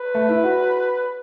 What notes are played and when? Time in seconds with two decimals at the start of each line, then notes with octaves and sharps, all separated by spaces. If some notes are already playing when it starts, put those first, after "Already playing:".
Already playing: B4
0.15 A3
0.29 E4
0.44 F#4